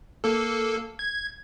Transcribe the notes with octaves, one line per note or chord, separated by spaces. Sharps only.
A#3 A4
G#6